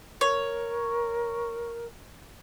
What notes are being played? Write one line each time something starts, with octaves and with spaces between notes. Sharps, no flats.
A#4 C#5